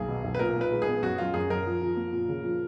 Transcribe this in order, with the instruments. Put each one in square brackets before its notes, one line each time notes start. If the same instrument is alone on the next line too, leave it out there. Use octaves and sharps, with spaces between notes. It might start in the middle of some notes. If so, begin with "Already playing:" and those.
Already playing: [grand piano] B1 A#3 [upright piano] G#4
[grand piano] B2
B1
[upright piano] B4
[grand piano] A#2 [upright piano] A#4
[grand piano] A#2 [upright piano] B4
[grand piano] G#3
[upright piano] G#4
[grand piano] B3
[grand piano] F#2 [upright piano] F#4
[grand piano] F#2 [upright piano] F4
[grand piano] F#2 [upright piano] G#4
[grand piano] F#2 [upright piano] A#4
[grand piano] F3
F3
A#3
A#2
C#3
F3